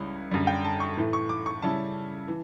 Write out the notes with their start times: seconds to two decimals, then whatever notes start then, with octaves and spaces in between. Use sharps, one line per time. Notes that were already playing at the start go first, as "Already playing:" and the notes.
Already playing: C#2 C#3 G3 C#4 E4
0.31 F#2 D3 G3
0.47 G5
0.65 A5
0.80 C#6
0.97 A2 E3 A3
1.13 C#6
1.29 D6
1.46 C#6
1.62 C#3 G3 C#4 E4 A5
2.28 E3